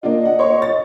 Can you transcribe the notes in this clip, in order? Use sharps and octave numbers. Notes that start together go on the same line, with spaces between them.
A#3 D4 F4 D#5
F#5
C#5 C6 C#6
A6